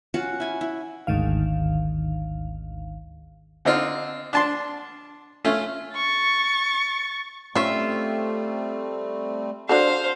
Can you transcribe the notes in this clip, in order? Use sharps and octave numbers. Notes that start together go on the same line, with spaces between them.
C#4 F4 F#4 F#5
E4 G#5
E4
G#1 D2 G#2 D#3 F5
D3 C4 D#4 F4
D4 A5 C6
A3 C#4 F4
C#6 A6
G3 A3 C4 C#4 F4 C#5 E5
D4 F#4 A4 C5 F5